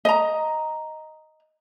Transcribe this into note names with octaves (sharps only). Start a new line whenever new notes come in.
D#5 A#5